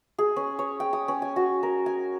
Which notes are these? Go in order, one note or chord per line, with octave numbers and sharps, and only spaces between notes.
G#4
C#4
C#5
G5
D#6
C#4
G#5
F#4
A#4
G#5